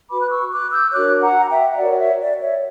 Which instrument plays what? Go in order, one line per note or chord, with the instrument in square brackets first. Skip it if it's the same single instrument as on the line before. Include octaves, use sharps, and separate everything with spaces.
[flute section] F#4 B4 B5 D6
F#6
C#6 E6
D6 F#6
E6 G6
D4 F#4 A#4 C#5 D6 F#6
F#5 A#5
A#5
E5 G5
E5
F#4 A#4 C#5 D5 F#5
D5
C#5 E5
D5
C#5 E5